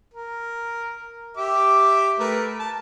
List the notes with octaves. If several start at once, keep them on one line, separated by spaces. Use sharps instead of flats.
A#4
G4 E5 D6
A3 A#4 B4
A5